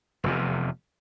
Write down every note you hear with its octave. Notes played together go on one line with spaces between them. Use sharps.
F1 E2 C3